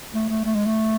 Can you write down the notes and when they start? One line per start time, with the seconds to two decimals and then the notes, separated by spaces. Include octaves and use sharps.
0.14 A3
0.29 A3
0.45 A3
0.55 G#3
0.66 A3